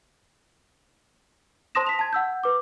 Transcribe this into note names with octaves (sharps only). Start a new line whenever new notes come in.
C5 A5 C6 D#6 A#6 E7
B6 F7
A5 G#6
F#5 E6 G6
B4 D6